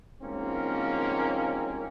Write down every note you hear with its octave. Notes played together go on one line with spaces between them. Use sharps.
C2 G#2 F3 A#3 C4 C#4